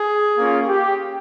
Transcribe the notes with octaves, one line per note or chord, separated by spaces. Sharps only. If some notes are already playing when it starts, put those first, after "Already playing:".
Already playing: G#4
A#3 C#4 F4
G4